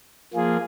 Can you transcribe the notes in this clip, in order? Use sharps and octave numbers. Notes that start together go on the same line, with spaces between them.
F3 A#3 F4 G#4